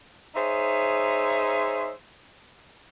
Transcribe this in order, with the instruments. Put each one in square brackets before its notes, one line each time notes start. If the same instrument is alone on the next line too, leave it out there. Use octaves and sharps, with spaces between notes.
[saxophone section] D#4 G#4 C5 C#5 E5